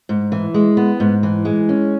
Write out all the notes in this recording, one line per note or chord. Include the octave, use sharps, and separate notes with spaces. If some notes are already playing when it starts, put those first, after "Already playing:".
G#2
E3
G#3
B3
G#2
E3
G#3
C#4